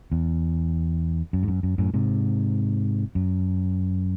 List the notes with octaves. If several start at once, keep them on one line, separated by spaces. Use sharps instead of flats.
E2
F#2
G#2
F#2
F#2
F#2 A2
G#2 C3
F#2